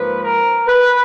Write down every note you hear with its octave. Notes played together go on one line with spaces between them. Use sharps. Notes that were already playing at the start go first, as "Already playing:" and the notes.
Already playing: G#2 F3 A#3 B4
A#4
B4